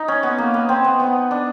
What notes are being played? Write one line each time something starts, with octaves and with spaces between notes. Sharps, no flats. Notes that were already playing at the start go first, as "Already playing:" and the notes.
Already playing: D#4
C#4
B3
A#3
B3
C4
B3
B3
D4